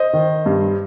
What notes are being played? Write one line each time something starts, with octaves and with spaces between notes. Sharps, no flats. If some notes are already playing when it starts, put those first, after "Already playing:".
Already playing: C5 D#5
D#3
G2